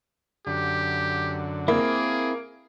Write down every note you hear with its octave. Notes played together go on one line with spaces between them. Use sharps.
F#2 D3 G4
A#3 C4 E4 G#4